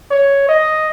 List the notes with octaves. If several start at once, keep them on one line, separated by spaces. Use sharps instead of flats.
C#5
D#5